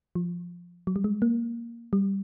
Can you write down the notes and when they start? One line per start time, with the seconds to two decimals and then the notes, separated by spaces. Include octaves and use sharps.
0.15 F3
0.87 F#3
0.96 G3
1.04 G#3
1.22 A#3
1.93 G3